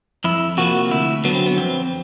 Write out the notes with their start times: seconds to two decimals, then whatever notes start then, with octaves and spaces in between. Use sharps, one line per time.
0.24 F2 E4
0.57 C3 F3 A#3 F#4
0.91 D2 E4
1.24 D3 F#3 B3
1.35 C4
1.46 B3
1.57 F2 C4